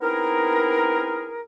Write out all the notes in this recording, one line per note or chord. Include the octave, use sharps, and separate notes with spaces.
B3 C4 D#4 E4 G#4 A#4